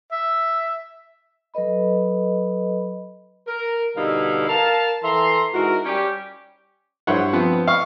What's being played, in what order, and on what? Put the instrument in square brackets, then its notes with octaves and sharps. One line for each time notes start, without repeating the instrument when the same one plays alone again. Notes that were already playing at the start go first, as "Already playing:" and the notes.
[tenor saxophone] E5
[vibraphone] F#3 A4 B4 D#5 B5
[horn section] A#4
B2 D3 G3 D#4 E4 F5
A#4 F5 A5
E3 A4 E5 A#5 C6
G#2 D#4 E4 F#4 A#4
G3 C#4 G4
[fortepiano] G2 E4 C5 C#5 F#5
F3 B3 C4
F5 C#6